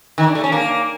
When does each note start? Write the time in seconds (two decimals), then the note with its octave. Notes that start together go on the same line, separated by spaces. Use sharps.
0.18 D#3
0.26 D4
0.35 A3
0.44 C#4
0.52 A#3